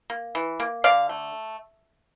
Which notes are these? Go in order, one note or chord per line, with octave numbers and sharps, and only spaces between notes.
A#3
E3
A#3
D3 D5 F5
A3